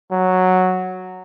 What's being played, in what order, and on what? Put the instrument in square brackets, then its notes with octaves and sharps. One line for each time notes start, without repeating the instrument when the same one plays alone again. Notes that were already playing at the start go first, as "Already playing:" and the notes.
[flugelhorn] F#3